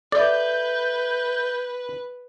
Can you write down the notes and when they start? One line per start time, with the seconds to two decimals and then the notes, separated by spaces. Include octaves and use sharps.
0.12 A4 B4 D5 E5 G6